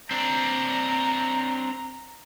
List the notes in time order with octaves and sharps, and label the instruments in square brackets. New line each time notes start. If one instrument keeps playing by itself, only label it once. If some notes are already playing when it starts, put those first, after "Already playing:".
[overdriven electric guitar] C4 D4 [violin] A#5